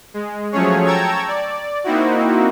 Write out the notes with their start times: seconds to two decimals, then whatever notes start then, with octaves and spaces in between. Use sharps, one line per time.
0.14 G#3
0.52 F3 F#3 A3 C#4 G#4 C#5
0.86 G5 A5 A#5 C#6 E6 G#6
1.28 D5
1.84 A#3 C4 D#4 E4 F#4